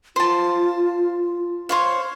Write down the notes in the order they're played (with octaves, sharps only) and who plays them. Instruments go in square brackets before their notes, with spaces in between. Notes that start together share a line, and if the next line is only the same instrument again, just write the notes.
[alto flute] F4 [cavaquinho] C5 A5
[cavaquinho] C5 C#5 F5